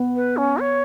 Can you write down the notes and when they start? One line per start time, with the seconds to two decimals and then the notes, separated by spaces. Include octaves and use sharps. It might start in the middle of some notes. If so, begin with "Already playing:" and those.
Already playing: B3
0.16 B4
0.37 C#4
0.59 C#5